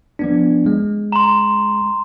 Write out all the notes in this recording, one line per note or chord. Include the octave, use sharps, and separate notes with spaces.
F3 B3 D4
G#3
A#5 C6